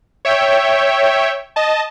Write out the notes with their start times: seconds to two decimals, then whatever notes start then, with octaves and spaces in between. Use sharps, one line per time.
0.25 C#5 E5 G5
1.56 D#5 A5